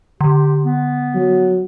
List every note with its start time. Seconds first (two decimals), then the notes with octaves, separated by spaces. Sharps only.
0.21 D3 G4
0.65 B3
1.15 F#3